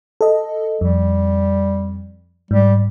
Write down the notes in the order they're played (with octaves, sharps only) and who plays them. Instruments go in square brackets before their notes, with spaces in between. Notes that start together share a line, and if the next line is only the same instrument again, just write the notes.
[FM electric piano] A4 D#5
[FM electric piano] F2 [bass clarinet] G3
[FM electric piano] G#2 [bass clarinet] G3